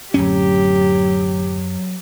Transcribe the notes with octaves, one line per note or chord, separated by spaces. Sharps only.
D1 F#2 F#3 C#4 G4